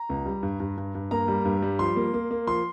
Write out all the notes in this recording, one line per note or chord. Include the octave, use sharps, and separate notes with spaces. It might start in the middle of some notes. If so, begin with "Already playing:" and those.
Already playing: A#5
C#2
G3
G2
G2
G2
G2
A#3 A#5
G3
G2
G3
F3 C6
A#3
A#3
A#3
F3 C6